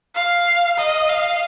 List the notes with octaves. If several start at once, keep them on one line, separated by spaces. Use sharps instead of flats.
F5
D#5
F5